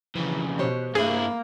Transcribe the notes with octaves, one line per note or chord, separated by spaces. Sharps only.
F2 C#3 E3
B2 G4 C5 C#5
G2 A#3 E4 G#4